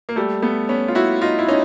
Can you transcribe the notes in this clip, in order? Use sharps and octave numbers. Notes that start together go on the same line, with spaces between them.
A#3
G3 A3
A3 B3
B3 C#4
F4
E4 F#4
D#4 F4
E4
C#4 D#4